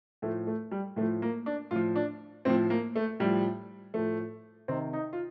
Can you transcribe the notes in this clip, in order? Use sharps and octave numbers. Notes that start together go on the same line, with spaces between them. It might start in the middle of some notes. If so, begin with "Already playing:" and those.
A2 F3 A3
A3
G3
A2 F3 A3
A#3
D4
A2 F3 F4
D4
A2 F3 C4
A#3
A3
A2 F3 G3
A2 F3 A3
C3 D#3 C4
D#4
F4